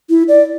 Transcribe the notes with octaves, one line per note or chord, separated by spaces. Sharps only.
E4
D5